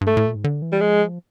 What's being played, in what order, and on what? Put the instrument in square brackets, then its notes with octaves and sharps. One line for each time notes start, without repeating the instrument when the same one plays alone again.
[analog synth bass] G2
[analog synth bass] G#2 [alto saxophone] A3
[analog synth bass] A2
A#2
G#2
D3
E3
[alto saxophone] G3
[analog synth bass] F3 [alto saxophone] G#3